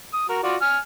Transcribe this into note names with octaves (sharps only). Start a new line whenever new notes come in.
D#6
F#4 A#4
F4 F#4 D5
G#5 F6